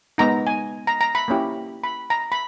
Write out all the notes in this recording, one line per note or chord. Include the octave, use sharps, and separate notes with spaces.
G#3 B3 D#4 A#5
G#5
A#5
A#5
B5
A#3 C#4 E4 G4
B5
A#5
B5